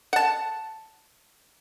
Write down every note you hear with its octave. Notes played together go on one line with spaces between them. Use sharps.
F#5 A5